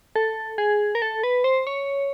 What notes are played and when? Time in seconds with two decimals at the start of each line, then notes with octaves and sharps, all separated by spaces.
0.16 A4
0.58 G#4
0.95 A#4
1.02 A4
1.23 B4
1.44 C5
1.67 C#5